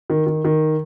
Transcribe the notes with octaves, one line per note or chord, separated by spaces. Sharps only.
D#3
D#3
D#3